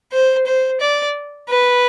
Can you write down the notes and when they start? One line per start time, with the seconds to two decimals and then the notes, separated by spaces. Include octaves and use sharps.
0.12 C5
0.46 C5
0.81 D5
1.49 B4